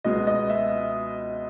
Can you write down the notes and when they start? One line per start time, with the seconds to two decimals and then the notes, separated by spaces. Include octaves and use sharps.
0.04 C#2 B2 G#3 B3 D#5
0.27 D#5
0.50 E5